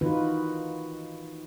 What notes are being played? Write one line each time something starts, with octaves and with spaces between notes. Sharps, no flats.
D#3 E3 D#4 F4 F#4 B4